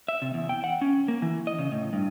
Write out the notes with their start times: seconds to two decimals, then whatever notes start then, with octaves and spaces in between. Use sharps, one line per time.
0.08 E5
0.22 C3
0.34 E2
0.49 G5
0.64 F#5
0.81 C#4
1.08 A#3
1.22 E3
1.47 D#5
1.59 C#3
1.72 A2
1.93 G2